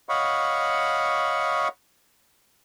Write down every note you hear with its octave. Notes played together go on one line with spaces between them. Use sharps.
C#5 D#5 F5 F#5 B5 C#6